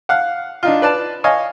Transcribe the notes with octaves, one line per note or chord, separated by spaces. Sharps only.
F5 F#5
D4 D#4 F4
B4 D5 A5
C#5 D#5 F5 G#5